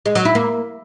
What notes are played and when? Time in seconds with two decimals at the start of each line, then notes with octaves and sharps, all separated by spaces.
0.06 G#3
0.15 F#3
0.25 E4
0.35 A#3